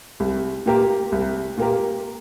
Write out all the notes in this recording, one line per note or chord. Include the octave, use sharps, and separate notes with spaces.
C2
A#2 A#3 G4 A#4
C2
A#2 A#3 G4 A#4